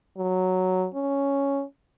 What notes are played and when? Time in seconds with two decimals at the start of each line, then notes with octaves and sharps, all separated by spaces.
0.17 F#3
0.94 C#4